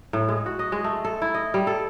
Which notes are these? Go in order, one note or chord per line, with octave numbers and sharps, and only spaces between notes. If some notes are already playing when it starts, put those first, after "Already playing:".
A2
G#3
F#4
D#5
G#3
A3
A4
E4
D#5
G3
A4